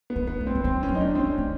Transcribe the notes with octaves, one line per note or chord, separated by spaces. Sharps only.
B3
G#3
B3
A3
C4
G#3
G3 C4
C#4
F#3
D#4
D4
G#3 C4
C#4
A3